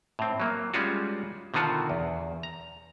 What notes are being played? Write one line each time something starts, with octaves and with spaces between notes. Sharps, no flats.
A2 C4
F#3 A#3
G3 G#3 C#4 F4 F#4
B2 D3 D#3 F4 F#4
E2
A#5